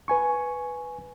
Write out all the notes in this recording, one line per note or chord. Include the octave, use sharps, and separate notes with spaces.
B4 G#5 C#6